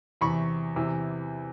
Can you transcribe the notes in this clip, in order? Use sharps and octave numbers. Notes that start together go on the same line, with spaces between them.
E2 C3 E3 B5 C#6
E2 C3 E3